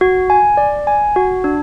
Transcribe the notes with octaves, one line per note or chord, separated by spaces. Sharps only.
F#4
G#5
D5
G#5
F#4
D4